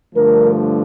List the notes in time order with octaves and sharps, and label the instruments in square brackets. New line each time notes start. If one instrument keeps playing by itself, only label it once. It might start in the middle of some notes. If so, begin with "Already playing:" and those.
[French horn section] G2 D3 F3 A3 A#4